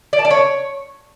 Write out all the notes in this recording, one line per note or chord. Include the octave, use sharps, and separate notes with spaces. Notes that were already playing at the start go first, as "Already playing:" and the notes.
D5
A5
D5
C#5